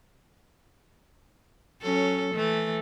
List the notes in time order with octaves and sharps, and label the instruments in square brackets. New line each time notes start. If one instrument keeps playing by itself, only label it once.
[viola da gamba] F#3 C#4 A4
E3 A3